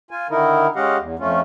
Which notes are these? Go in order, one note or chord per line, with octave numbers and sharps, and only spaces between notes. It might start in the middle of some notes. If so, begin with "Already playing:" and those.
F4 G#5
D3 D#3 D#4 E4 A#4
G#3 C#4 G4 D#5 F5 F#5
E2
F2 A3 C#4 F4